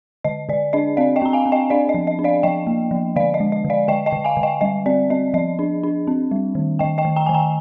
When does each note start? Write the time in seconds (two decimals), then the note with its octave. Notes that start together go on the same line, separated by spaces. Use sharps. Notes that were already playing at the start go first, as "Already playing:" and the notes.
0.24 D3 D#5
0.49 D3 D5
0.73 D4 D#5
0.97 C4 D5 F5
1.16 D#5 G5
1.22 C4 A#5
1.33 F5 G#5
1.46 C4
1.52 D#5 G5
1.70 D4 D5 F5
1.89 D#5
1.94 F3
2.07 D#5
2.19 D4
2.24 D5 F5
2.43 F3 D#5 G5
2.67 A#3
2.91 F3
3.16 D3 D5 F5
3.34 D#5
3.40 G#3
3.52 D#5
3.64 D3
3.70 D5 F5
3.88 D3 D#5 G5
4.06 D#5 G5
4.12 D3
4.25 F5 G#5
4.37 D3
4.43 D#5 G5
4.61 G3 D#5
4.86 C4 D5
5.10 C4 D#5
5.34 F3 D#5
5.59 D4
5.83 D4
6.07 C4
6.31 G3
6.55 D#3
6.79 D#3 D#5 G5
6.98 D#5 G5
7.05 D#3
7.16 G5 A#5
7.26 D#3 G#5
7.34 G5 A#5